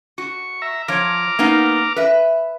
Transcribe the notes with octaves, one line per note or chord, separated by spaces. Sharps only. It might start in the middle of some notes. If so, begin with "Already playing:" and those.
F#4 C#6
E5 A#5
F3 C#5 A#5 D6 F6
A#3 B3 D#4
B4 E5